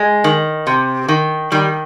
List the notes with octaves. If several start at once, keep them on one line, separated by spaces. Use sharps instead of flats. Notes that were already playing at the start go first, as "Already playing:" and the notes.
Already playing: G#3
D#3
C3
D#3
D#3 G3